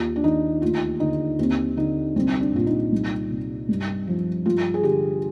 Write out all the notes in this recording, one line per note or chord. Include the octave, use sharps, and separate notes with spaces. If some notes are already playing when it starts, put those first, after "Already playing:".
Already playing: D#2 F4
D4
D#3 D#4
D2 F4
D3 D#4
D#2 C4
D3 D#4
C2 C4
D4
A#2 F4
D#4
C2
C3
G2
F3
G2 F4
G#4
D3 G4